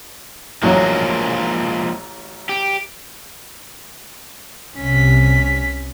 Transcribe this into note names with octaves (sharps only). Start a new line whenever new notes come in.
A1 F3 F#3 G#3 A#3
G4
C2 C3 C#4 B6